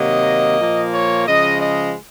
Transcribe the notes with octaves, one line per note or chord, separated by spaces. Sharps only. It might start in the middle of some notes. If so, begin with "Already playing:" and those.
Already playing: C3 D#3 F#3 A#3 D#5
A#2 F3 A#3
C#5
C#3 F3 G#3 D#5
D#5